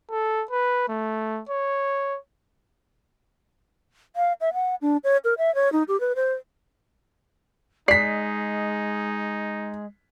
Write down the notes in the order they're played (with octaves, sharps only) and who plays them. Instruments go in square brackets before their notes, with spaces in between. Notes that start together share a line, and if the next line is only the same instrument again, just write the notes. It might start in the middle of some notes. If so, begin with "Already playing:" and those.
[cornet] A4
B4
A3
C#5
[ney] F5
E5
F#5
D4
C#5
A#4
E5
C#5
D#4
G4
B4
C5
[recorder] G#3 [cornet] D#4 [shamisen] D5 [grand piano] B6 C7